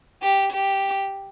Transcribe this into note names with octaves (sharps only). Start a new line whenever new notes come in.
G4
G4